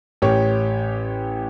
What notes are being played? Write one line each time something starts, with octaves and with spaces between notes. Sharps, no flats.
A1 G4 C#5